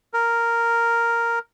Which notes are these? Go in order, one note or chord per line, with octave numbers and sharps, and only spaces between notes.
A#4